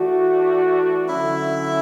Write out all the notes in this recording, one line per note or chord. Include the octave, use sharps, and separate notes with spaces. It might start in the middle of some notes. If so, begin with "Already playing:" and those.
Already playing: E3 A3 D4 F#4
D3 F#3 C#4 E4 E5